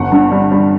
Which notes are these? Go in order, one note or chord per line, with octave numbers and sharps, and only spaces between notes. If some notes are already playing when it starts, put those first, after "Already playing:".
Already playing: G1 F#5
G2
G3
G3